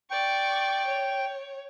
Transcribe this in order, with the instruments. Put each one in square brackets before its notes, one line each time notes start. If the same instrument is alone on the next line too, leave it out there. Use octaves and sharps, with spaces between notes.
[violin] D5 C#6 [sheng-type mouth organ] G5
[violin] C#5